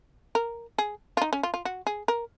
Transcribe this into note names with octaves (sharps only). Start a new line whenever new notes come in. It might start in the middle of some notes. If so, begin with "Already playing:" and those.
A#4
G#4
F4
D#4
C#4
F4
F4
F#4
G#4
A#4